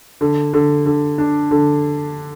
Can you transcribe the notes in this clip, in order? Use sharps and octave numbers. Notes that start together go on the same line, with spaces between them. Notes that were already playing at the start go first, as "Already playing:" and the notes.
D3
D3
D3
D4
D3